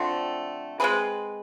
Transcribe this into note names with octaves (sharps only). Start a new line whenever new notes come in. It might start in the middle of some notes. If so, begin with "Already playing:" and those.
Already playing: D3 F3 A3 C4
G#3 C4 G#4 B4